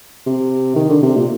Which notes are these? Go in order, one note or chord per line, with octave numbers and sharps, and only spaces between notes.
C3
D#3
D3
C3
A#2